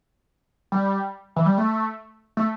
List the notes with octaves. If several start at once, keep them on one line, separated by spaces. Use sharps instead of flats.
G3
E3
G3
A3
A3